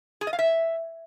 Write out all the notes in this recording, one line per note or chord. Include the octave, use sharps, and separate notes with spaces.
G#4
D#5
F5
E5